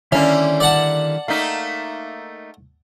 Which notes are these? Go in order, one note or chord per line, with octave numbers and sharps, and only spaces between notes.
D3 D#3 G3 A#3 C#4 E4 E5
D5 F#5 A5
A3 A#3 D#4 E5 F5